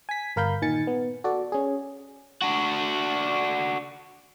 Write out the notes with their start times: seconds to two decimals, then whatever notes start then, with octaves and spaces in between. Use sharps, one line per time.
0.09 G#5 B6
0.36 G1 A#4 F5 B5 G6
0.62 A#2 D#3 G#5 A6 C#7
0.87 B3
1.24 F#4 A4 D5
1.52 C#4 G#4
2.42 D4 F#4